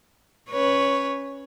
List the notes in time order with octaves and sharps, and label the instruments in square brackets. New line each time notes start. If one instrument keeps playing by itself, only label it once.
[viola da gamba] C#4 B4 C#5